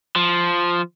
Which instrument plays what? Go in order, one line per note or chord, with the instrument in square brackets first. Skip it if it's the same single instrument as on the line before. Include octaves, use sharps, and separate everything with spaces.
[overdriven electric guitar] F3